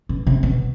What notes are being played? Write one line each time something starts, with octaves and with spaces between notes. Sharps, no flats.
B2
C3
B2